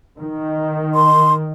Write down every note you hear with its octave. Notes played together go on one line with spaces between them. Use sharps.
D#3
C6